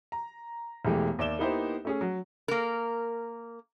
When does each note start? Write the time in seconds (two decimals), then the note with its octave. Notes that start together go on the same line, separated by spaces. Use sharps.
0.12 A#5
0.85 E1 E3 G#3 A3 G4
1.19 D#2 D5 E5 E7 G7
1.39 A#3 B3 D#4 E4 G4 C5
1.85 A3 C#4 G#4
2.01 F#3
2.48 A#3 A#4